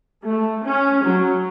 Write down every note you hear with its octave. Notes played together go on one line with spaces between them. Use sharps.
A3
C#4
F#3